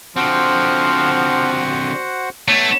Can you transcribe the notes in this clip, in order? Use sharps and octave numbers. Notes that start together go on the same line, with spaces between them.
D3 F3 C4 F#4 C5 F#5
A3 B3 C#5